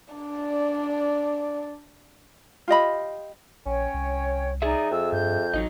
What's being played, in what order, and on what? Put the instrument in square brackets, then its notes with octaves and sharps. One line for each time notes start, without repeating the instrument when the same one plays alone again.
[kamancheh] D4 D5
[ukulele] F4 G4 D#5 B5
[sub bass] A#1 [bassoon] C#4 [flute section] C#5 G5
[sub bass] C2
[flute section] D#4 D5 G#5 [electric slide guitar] G#4 E5
[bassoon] F2 [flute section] E6
[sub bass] G2 [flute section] G6
[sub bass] A1 [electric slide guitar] F#3 D#4 D#5